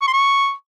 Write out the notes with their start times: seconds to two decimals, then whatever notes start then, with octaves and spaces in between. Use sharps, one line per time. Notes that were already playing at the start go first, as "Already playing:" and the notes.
0.02 C#6
0.08 C6
0.14 C#6